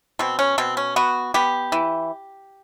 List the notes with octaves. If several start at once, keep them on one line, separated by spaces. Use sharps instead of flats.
B2 C4
C#4
B2 C4
C#4
B3 F#4
B3 G4
E3